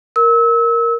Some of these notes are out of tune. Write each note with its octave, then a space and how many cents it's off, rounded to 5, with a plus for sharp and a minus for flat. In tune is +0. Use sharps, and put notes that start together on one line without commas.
A#4 +0 E6 -30